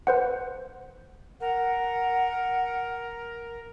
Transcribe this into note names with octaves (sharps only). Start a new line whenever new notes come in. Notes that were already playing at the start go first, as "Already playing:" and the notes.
B4 C5 F#5
A#4 F#5